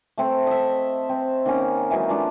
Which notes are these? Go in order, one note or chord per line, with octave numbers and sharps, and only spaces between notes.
A3 C4 A4
D#5 E5
C4
D#3 A#3 C#4 A#4
E3 F#3 G#3 D#4
A3 D4 F4